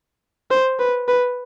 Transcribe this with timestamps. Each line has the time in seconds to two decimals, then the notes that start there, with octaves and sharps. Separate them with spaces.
0.51 C5
0.79 B4
1.08 B4